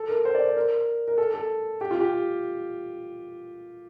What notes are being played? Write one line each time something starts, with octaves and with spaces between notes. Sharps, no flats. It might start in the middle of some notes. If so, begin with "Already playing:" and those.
Already playing: A4
A#4
C5
D5
C5
A#4
A#4
A4
A4
G4
F4
G4